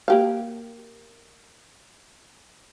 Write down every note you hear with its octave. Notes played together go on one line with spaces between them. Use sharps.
A#3 G4 F5